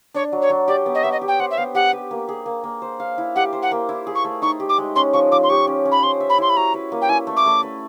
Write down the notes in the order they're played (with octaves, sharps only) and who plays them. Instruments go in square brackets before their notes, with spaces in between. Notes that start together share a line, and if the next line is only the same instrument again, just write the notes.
[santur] D4 [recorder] C#5
[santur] F#3
[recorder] C#5
[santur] F#3
[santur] G4 [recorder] D5
[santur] B3
[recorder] D#5
[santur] B3 [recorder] E5
[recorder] D#5
[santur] G4
[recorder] G5
[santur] C5 [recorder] F#5
[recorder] E5
[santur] B3 [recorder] F5
[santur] G4 [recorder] F#5
[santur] B4
A#3
G#4
A#3
A#3
C5
F5
E4
[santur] G4 [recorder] F#5
[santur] C5
[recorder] F#5
[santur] A#3
E4
G#4
[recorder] C#6
[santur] A3
[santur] D#4 [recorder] C#6
[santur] G4
[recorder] D6
[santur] G#3
[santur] C#4 [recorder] C6
[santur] F3 [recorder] C#6
[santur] F3 [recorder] D6
[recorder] C6
[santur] G4 [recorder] C#6
[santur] C#4
C#4
[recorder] B5
[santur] C5 [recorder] C6
[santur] E5
[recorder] B5
[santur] E4 [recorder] C6
[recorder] B5
[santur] F#4 [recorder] A#5
[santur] B4
A#3
[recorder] G5
[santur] E4 [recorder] G#5
[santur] A3
[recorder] D6
[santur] A3
B4